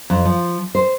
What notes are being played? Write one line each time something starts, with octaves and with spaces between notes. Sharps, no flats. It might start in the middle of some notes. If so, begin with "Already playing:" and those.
F2
F3
C5